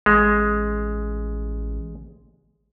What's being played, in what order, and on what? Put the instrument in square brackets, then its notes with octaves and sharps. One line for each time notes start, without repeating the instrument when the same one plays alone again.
[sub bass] A1 [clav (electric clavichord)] G#3